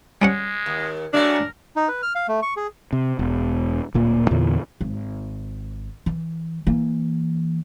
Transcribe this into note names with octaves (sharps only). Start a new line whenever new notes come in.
G3 G#3 C#4 F#5
D#2
F#3 G#3 A3 D4 A#4
D#4
B4
F6
F5
A3
C#6
G#4
C3
E1
D1 A#2 A#3
E2 A#2 D3 E3
G#1
E3
E3 A#3